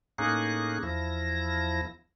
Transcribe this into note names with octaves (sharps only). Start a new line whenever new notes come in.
A2 A#3 C#4 D#4 G#4 F#6
E2 F3 E4 A#6